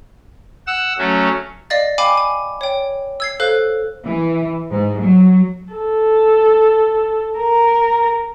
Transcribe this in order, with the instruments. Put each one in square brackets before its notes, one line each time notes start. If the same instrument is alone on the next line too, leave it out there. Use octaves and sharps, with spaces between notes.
[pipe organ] F#5 E6
F#3 A3 C#4
[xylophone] D5 D#5 F5 A6
F5 G5 G#5 B5 D6
G#5
C#5 G5
E6 G#6 C7
A4 C5 F5 F#6
[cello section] E3
G#2
F#3
[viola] A4
A#4